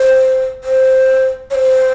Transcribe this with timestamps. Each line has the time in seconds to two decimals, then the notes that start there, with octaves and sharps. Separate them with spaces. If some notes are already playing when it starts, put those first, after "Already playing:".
Already playing: C5
0.64 C5
1.50 C#5
1.55 C5